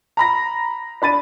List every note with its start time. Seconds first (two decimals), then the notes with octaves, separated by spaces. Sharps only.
0.17 A#5 B5 A#6
1.02 D4 B5 A6 D#7